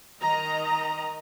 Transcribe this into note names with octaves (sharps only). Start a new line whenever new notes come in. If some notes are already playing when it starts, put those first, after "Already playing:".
D#3 D#5 A#5